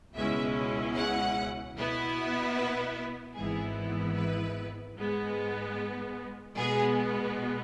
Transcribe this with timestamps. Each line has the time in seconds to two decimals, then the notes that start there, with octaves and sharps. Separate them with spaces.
0.16 C#2 B2 G#3 C#4 E4 E5
0.96 F#5
1.77 B2 B3 E4
2.56 B4
3.36 G#1 G#2 E3 B3 E4 G#4
4.16 B4
4.96 G#2 G#3 B3
6.56 B2 G#3 B3 G#4